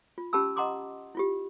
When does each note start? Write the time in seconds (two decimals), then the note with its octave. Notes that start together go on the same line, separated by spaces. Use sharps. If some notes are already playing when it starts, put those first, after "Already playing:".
0.18 F4
0.33 C#4 G4 A5 B5 E6
0.56 D#5 F#5 A#5 C6 D6 D#6
1.15 E4 F4 G4